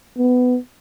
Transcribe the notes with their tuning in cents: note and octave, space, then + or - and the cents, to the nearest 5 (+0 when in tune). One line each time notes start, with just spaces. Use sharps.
B3 +15